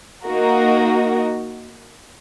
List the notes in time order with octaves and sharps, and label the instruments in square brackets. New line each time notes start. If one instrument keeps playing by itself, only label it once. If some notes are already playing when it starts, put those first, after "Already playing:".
[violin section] A#3 D#4 F#4 A#4